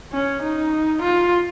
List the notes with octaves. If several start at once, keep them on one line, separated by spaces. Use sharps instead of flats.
C#4
D#4
F4